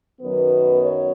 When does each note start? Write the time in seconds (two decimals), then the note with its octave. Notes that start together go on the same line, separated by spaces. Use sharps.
0.20 F#2 D#3 F#3 B3 B4
0.81 C#5